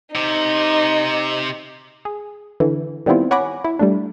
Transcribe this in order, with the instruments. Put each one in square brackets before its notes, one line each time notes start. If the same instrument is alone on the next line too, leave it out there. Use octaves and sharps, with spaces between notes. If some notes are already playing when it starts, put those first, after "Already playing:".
[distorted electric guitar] C3 [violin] D#4
[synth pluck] G#4
D3 E3
D#3 G3 B3 C4 E4 F4
C#5 F#5 G#5 B5 D6 A#6
E4
G3 A3 D4